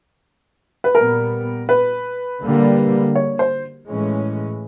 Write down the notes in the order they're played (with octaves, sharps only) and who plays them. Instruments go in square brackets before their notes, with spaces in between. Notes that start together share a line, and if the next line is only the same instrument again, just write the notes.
[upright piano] B4
[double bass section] A#2 G3 B3 [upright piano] A#4
[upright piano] B4
[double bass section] D3 G3 A#3
[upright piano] C#5
C5
[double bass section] A2 E3 G#3 C#4